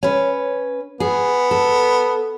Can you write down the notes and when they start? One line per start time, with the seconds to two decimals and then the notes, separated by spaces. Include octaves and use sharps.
0.03 C#4 B4
1.00 B3 G#4
1.51 A4